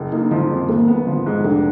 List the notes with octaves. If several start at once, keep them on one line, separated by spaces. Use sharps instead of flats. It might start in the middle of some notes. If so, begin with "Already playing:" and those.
Already playing: F#1
A#3 D#4
F3 D#4
F2
G#1 A#3
B3
F3
G#2
F1 D4